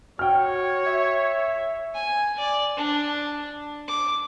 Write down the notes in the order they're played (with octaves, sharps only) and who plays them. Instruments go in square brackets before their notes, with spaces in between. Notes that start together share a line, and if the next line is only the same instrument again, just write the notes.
[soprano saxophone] F#4 [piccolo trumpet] C#5 [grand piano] G5 F6
[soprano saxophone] E5
[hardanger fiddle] G#5
D5
D4
D6